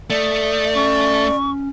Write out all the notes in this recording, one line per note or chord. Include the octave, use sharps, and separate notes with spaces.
A3 D5 D#6
C#4 C#6